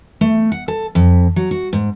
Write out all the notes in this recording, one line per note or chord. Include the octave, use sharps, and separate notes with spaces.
A3
F#5
A4
F2
F#3
F#4
G#2